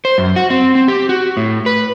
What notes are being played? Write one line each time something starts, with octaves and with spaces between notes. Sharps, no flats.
C5
F#2
F#4
C4
C4
G4
F#4
A2
B4